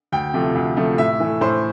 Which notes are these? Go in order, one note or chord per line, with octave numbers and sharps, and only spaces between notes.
D2 G5
C3 F3 A3
D2
C3 F3 A3
A2 E5
E3 A3
A2 C5